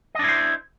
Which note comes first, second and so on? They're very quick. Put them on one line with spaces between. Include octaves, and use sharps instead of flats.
D#5 D4 E4 C5